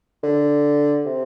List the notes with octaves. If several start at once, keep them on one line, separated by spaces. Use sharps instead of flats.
D3
C3